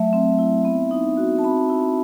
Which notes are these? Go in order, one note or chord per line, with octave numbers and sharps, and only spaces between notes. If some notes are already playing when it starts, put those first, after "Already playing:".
Already playing: F#3 A3 E5
C4
E4
B3
D#4
F#4
A5
C4 B5
E4